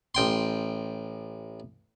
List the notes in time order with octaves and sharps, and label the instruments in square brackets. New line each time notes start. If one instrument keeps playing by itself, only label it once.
[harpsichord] A1 G5 C6